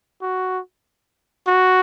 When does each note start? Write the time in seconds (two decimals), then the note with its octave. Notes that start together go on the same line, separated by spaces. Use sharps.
0.22 F#4
1.48 F#4